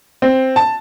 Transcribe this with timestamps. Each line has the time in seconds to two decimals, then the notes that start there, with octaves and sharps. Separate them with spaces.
0.22 C4
0.56 A5